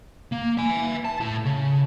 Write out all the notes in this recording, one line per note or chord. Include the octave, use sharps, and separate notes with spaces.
A#3
E5 G#5
A5
A2
C#3